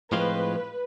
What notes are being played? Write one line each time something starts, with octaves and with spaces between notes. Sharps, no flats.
A2 F3 G#3 C4 F4 B4